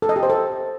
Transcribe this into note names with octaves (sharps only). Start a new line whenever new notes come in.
A4
D#5
G4
C5
A4